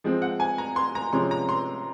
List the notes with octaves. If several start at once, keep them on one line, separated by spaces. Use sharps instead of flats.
F3 G#3 C4
F#5
G#5
A#5
C6
A#5
C3 F3 G#3 C#4 C6
A#5
C6